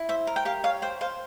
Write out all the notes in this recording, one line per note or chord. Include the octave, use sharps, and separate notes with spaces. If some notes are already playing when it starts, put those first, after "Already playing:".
Already playing: E4
C5 E5
A#4
G5
G4 F5
C#5 F5
C5 G5
C5 F5